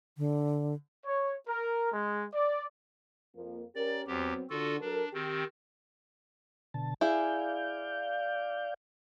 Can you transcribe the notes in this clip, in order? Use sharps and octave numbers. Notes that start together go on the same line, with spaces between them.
D3
C#5
A#4
G#3
D5
F2 F3 A#3
C#4 G4 A#4 D5
E2 F#3 B3 C4 G4
D3 F4 F#4 A4
F#3 D4 A4 A#4
D#3 C4 G4
B2 D3 A5
E4 G#4 D5 F5 G6